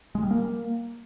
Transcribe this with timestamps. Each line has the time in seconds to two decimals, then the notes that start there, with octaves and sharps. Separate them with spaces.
0.15 G#3
0.23 G3
0.31 A#3